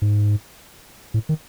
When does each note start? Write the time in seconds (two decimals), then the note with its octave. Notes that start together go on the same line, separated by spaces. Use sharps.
0.02 G#2
1.14 A2
1.29 D#3